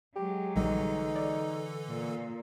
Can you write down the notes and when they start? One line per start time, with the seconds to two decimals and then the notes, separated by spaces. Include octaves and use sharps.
0.16 F#3 G#3 G4
0.56 A#1 D3 E3 G3 D#4 A4 D#5
1.16 D5
1.88 A#2